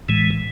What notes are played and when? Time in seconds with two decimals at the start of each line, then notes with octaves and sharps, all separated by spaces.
0.08 A2 E3 G#3